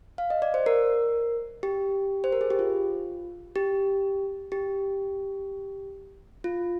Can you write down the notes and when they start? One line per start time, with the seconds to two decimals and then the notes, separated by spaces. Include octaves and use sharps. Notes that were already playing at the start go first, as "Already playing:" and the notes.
0.18 F5
0.30 D#5
0.42 D5
0.54 C5
0.66 A#4
1.63 G4
2.24 C5
2.32 A#4
2.41 G#4
2.50 G4
2.59 F4
3.56 G4
4.52 G4
6.44 F4